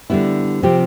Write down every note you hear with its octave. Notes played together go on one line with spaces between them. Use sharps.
D3 G3 B3 E4
C3 F3 C4 G4